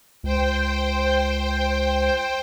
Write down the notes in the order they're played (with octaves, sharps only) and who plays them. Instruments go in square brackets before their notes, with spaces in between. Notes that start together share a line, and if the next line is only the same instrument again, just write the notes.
[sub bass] C#2 [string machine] C5 G5